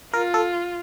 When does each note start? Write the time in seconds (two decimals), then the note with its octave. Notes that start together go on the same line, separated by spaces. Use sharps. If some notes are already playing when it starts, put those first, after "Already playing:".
0.13 F4 A#4
0.34 A4